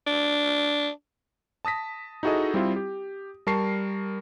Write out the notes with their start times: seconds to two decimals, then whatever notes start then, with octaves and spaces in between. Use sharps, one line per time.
0.07 D4
1.65 A5 D#6 A#6 B6
2.23 D#4 E4 F#4 G#4 A4 D#5
2.54 G3 C4 E4 F4
2.76 G4
3.47 G3 A#4 A5 C#6 C7